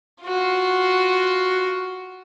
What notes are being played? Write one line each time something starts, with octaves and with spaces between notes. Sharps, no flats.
F4 F#4